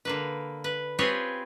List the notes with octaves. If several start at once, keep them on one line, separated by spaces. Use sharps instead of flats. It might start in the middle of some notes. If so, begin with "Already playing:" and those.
D3 A#3 B4
B4
C4 F4 G4 G#4 B4 C#5